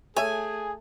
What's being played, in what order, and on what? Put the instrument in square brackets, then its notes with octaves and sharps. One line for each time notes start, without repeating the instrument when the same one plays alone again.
[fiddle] A3 [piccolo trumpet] G#4 [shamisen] C#5 E5 [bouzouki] G#5